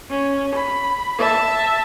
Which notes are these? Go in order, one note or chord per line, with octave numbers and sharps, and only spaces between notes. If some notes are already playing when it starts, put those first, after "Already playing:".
C#4
B5
E5 A5